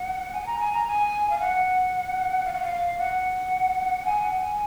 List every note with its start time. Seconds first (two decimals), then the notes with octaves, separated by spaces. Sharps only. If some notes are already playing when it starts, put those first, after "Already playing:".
Already playing: F#5
0.33 G#5
0.46 A#5
0.59 G#5
0.73 A#5
0.86 G#5
1.30 F5
1.39 F#5
2.45 F5
2.52 F#5
2.61 F5
2.98 F#5
4.05 G#5
4.22 F#5
4.40 G#5